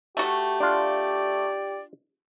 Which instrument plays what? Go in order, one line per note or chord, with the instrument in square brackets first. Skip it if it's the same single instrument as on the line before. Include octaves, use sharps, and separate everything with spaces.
[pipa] A3 F#4 [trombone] G4
[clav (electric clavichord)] D4 F4 [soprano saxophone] D5